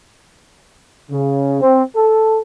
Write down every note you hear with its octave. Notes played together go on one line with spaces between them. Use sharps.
C#3
C4
A4